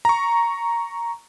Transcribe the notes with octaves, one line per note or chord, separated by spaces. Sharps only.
A#5 C#6